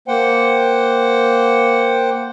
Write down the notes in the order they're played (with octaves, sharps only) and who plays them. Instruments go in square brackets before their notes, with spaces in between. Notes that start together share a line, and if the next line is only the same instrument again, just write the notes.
[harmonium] A#3 C5 F#5 G5